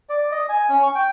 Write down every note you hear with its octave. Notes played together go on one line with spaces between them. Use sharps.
D5
D#5
G#5
C#4
C#6
G5